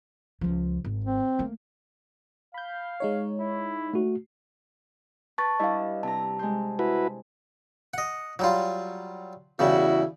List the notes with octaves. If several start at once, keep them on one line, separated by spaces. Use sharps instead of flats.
C#2 F3
G#1
C4
A3 A#3
F5 B5 G6
G#3 D#4 C#5
E4
A3 F#4
B4 A5 C#6 A6
G3 D4 E4 D#5 F5
C3 A5 A#5
G#3 C5
E4 F#4 B4
D#5 F#5
F#3 G3 F4
E2 C#3 G3 E4 F#4